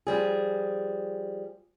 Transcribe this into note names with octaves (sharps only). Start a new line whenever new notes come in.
F3 G3 G#4